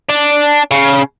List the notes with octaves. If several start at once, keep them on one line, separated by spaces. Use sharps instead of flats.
D4
C#3